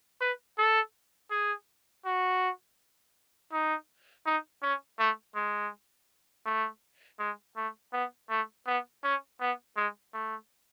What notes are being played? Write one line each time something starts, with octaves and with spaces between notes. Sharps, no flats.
B4
A4
G#4
F#4
D#4
D#4
C#4
A3
G#3
A3
G#3
A3
B3
A3
B3
C#4
B3
G#3
A3